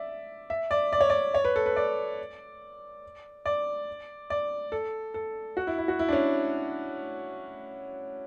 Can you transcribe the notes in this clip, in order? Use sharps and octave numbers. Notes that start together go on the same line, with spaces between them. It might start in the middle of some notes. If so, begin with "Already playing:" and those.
Already playing: D5 E5
E5
D5
D5
C#5
D5
C#5
B4
A4
B4
D5
D5
D5
A4
A4
F#4
E4
E4
F#4
E4
D4
C#4